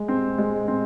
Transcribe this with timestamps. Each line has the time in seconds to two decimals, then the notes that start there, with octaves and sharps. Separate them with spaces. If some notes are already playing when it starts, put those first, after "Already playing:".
Already playing: G#3
0.08 C4
0.38 G#3
0.68 C4